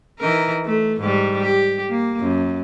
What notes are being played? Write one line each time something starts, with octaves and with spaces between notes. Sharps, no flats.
E3 D#4 A#4
A3
G#2 G3
G4
A#3
F#2